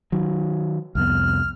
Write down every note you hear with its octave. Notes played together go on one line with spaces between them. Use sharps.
D#3 F#3
C2 F2 B3 F6